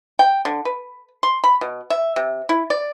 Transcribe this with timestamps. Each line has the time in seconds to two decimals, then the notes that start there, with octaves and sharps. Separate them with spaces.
0.19 G5
0.45 D3
0.65 B4
1.23 C6
1.44 B5
1.61 B2
1.90 E5
2.16 C3
2.49 E4
2.70 D5